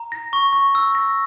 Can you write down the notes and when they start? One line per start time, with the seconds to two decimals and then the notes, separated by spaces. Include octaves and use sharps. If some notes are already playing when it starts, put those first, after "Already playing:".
Already playing: A#5
0.12 A#6
0.33 C#6
0.53 C#6
0.75 E6
0.95 A#6